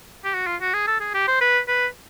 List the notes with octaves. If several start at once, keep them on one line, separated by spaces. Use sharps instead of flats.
G4
F#4
F4
F#4
G#4
A4
G#4
G4
C5
B4
B4